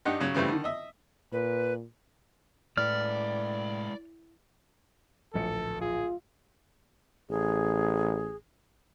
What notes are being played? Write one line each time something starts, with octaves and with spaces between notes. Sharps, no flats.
G2 D#4 G4 F#5
C#3 F#3
C#3 E3 G3 A3 C4
D3 D#3
D#5 E5
A#2 B4
A2 G#3 B4 D5 F6
D1 A#1 A4 C#7
F4 G#4
A1 G#4